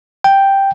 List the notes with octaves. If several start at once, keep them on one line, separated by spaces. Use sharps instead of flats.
G5